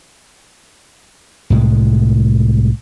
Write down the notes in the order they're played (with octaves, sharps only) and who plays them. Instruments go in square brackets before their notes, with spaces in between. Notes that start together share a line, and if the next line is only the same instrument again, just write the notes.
[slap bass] C2 A2 G#3